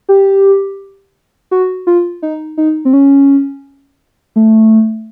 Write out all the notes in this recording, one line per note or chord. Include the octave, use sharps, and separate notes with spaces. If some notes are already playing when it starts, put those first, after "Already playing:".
G4
F#4
F4
D#4
D#4
C4
C#4
A3